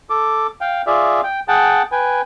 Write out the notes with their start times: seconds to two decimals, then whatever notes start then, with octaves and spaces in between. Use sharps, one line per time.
0.10 A4 D6
0.61 F5 G5
0.87 F4 G#4 D5 E5
1.24 G5
1.48 G#4 F#5 G5 A5
1.92 B4 G5 G#5